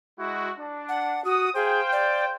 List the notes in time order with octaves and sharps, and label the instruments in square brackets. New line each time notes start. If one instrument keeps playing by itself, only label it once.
[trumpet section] G#3 E4 F#4
D4
[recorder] F#5
[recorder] F#4 [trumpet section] D#6
[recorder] G#4 [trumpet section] C5 F5 G5
[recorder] D5